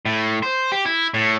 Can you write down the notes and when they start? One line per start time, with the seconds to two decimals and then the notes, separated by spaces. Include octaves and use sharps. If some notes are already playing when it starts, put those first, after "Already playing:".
0.06 A2
0.43 C5
0.72 G4
0.86 E4
1.14 A2